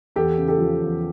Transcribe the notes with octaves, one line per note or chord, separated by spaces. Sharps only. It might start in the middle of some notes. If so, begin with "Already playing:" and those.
E2 G4 A4
C#3
G4 A4
F3
E2